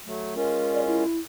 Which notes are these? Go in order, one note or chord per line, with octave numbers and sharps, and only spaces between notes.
F#3 A3
G#3 C#4 F4 A#4
D5
E4